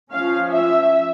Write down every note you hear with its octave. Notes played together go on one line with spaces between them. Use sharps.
F3 C#4 F5
E5